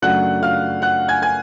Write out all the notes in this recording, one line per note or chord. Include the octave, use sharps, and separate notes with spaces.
F#2 C#3 F#3 A3 D4 F#5 F#6
F5 F6
F#5 F#6
G#5 G#6
G#5 G#6